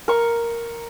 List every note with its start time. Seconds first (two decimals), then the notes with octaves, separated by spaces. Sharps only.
0.08 A#4 C#6